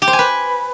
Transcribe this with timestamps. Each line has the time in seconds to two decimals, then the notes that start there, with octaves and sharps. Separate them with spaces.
0.02 G4
0.07 C5
0.13 G#5
0.19 B4